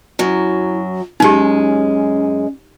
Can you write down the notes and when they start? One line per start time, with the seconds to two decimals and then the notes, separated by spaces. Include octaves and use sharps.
0.19 F#2 F#3 E4
1.20 F#2 G#3 C#4 D#4 G4